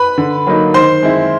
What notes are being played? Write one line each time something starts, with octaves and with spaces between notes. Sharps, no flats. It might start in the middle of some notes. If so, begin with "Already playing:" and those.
Already playing: B4 B5
D3
F#3 A#3 D#4
D#3 C5 C6
G#3 C4 E4